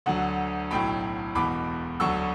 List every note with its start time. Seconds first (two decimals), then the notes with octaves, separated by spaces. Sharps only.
0.06 D2 D3 F#3 F#5
0.71 B1 A2 F#3 G5 B5
1.35 E1 E2 B2 B5 D6
2.00 D2 D3 F#3 C#6 E6